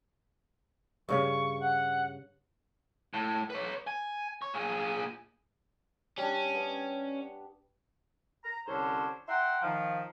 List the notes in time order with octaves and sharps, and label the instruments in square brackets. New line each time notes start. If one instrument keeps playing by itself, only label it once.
[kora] G2 C#3 C#4 [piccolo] C#6
[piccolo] F#5
[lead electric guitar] A2
B4 C#5
G#5
C#5
A#2 G#4
[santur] G3 D4 [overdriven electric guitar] C#4
[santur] B3
[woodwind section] A#5
C2 D3 C#4 C5 C#5
E5 F#5 G5 A#5 C6
D#3 F3 F5